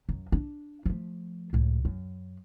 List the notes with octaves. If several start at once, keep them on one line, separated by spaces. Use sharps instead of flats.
F#2
D4
F3 A3
C#2 A2
F#2